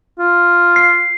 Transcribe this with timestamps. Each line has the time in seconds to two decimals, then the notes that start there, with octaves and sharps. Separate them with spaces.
0.19 F4
0.76 C7